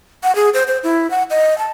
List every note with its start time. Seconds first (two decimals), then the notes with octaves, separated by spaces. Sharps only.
0.23 F#5
0.35 G#4
0.54 C5
0.67 C5
0.83 E4
1.10 F#5
1.30 D#5
1.58 A5